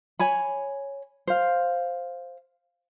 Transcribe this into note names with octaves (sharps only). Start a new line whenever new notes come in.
C#5 G#5 B5
C5 F5